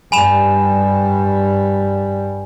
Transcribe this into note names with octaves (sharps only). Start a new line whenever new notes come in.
G2 G3 G#5 B5 E7